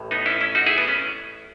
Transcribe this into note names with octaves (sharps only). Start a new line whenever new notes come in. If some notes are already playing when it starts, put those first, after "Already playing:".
Already playing: A1 A2
B3 D#4
C#4 E4
C#4 E4
D#4 F#4
E4 G#4
B3
C#4